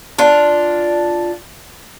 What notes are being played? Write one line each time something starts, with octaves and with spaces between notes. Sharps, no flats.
D4 F4